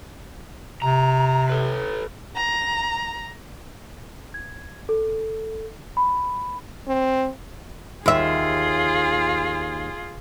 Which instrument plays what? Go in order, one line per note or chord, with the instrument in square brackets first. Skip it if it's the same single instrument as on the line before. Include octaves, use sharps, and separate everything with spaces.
[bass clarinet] C3 [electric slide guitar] A#5
[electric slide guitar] A4 B4
[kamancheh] A#5
[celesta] G#6
A4
B5
[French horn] C4
[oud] D#2 E5 [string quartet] F4 G#4